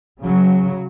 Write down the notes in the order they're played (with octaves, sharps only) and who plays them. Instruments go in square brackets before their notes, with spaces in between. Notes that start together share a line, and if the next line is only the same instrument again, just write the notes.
[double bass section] C#3 F#3